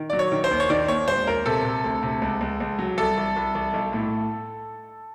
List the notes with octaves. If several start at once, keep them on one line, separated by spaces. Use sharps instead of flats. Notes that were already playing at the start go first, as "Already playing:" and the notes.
Already playing: D#3
F#3 D5
C#5
D#3
C5
D#2
C#5
D#3 D5
D#2 C#5
E1 C5
D#2 A#4
C3 A4
C3
D2
C3
C#2
C#2
C#2
F#3
C2 A4
C2
C2
C2
B1
A2